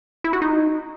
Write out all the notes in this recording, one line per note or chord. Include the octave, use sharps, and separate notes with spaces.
E4
F#4
D#4